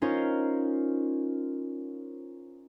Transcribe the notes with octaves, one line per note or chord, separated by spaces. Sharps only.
C#4 D#4 F4 A#4 C5 C#5